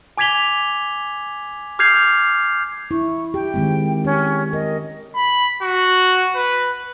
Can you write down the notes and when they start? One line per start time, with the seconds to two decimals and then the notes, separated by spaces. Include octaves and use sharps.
0.17 G#5 D6 G#6 B6 F7 G7
1.79 D6 F6 G6 G#6 C7 F7
2.91 E4 C#6
3.34 G4 G5
3.54 D#3 G#3 C4
4.04 C#4 G4
4.53 A#4 D#5
5.15 B5
5.62 F#4
6.36 B4